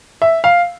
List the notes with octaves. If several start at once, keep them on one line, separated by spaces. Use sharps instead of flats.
E5
F5